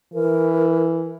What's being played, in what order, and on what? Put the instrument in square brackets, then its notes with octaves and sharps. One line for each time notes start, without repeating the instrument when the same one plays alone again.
[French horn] E3 [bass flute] A#4